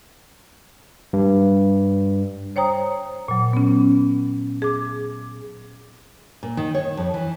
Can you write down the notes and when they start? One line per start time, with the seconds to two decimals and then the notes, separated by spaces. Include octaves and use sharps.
1.13 G2
2.56 C5 C#5 G5 A#5 D#6
3.28 A#2 F#3
3.53 B3 C#4
4.62 G#4 D6
6.43 A#2
6.57 D#3
6.75 C#5
6.97 F2
7.14 E3